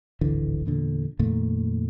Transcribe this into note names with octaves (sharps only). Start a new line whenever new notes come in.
D1 G#1 D3 E3
E2 A#2 D3
F2 A#2 D#3 A3